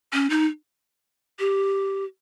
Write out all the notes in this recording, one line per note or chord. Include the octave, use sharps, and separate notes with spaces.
C#4
D#4
G4